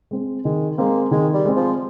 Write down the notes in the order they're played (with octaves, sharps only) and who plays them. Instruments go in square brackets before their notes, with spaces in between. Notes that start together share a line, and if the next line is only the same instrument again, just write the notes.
[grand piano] G#3 C4
[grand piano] D#3 [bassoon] G#3
[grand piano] G#3 C4 [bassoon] A#3
[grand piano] D#3 [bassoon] G#3
[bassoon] G3
[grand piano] G#3 C4
[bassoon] F3